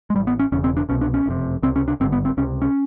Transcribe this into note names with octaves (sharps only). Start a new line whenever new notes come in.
G#3
A1 A2 G3
B3
C#4
E1 E2 C#3 C#4
C4
D4
C2 B2 C#4
D4
C#4
F#1 F2 C3
C#2 C3 C4
C#4
D4
G#1 G2 D3 C4
B3
C4
C#2 C3 C#4
C#4